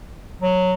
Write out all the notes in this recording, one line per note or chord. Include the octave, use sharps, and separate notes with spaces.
F#3